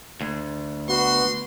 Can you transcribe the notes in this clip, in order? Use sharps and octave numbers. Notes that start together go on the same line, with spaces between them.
D2
B3 F#4 C6